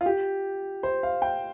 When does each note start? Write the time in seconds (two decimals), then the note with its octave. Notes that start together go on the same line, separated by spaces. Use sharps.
0.01 F4
0.06 G4
0.83 C5
1.03 F5
1.22 G5